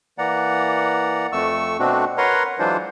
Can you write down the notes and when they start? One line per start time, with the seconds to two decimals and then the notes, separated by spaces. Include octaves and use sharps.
0.18 E3 A#3 D5 F#5 A#5
1.32 F2 A3 C#6 E6
1.79 B2 A3 C4 D4 F#4
2.18 A#4 B4 C#5 F#5 A#5 C6
2.59 E3 F#3 G#3 D4 F4 C5